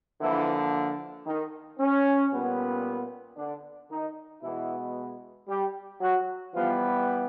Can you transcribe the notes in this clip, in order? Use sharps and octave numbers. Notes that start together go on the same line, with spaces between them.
D3 E3 F3 A#3 E4
D#3 D#4
C#4
A#2 G3 B3
D3 D4
D#3 D#4
B2 E3 G#3 B3 E4
G3 G4
F#3 F#4
E3 F3 G3 B3 F4